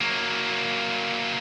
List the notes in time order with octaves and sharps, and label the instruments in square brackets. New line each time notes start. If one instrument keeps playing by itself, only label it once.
[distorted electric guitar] F#3 A#3